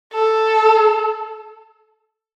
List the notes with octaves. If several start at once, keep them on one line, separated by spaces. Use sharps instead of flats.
A4